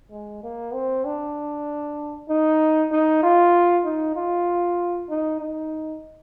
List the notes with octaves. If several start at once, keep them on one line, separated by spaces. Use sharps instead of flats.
G#3
A#3
C4
D4
D#4
D#4
F4
D#4
F4
D#4
D#4